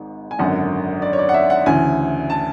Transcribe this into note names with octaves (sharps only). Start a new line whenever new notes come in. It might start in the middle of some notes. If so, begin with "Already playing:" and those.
Already playing: G#1 G#2
G#5
G#1 F#2 D3 F#5
D5
C#5
D5
F#5
E5
F#5
D2 C#3 E3 G#5
A5